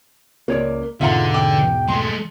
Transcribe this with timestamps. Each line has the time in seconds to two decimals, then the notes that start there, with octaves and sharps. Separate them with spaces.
0.48 C#2 A#3 C#5 D5
1.01 E2 G#2 B2 D3 F4 E5 F#5 A#5
1.34 G5 D6
1.88 G#3 A3 C6